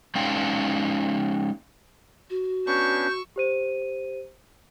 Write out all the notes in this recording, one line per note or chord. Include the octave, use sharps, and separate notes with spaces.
G#3 C#4 D#4 D5 F5 G5
F#4
B3 C#4 D4 C#6 E6 G6
G4 C5 D#7